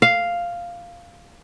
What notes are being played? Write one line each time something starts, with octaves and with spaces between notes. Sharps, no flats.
F5